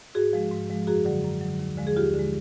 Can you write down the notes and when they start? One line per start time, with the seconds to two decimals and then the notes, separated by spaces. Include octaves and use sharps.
0.15 G#2 F#4 G#4
0.33 F3 G#3
0.51 G#2
0.70 F3 G#3
0.87 F#2 F#4 G#4
1.05 D3 F#3
1.24 F#2
1.41 D3 F#3
1.59 D#2
1.78 D3 F3 G#3
1.87 G#4
1.96 D#2 F4 G4
2.14 D3 F3 G#3